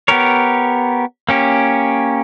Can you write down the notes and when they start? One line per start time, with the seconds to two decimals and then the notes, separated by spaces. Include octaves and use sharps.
0.08 B3 G4 A#4 C#5
1.29 A#3 C#4 G4